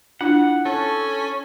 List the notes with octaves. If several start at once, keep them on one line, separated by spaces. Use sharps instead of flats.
D4 E4 F4 F#5
C#4 A4